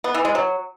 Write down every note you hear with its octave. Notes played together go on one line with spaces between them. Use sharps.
B3
E3
G#3
F#3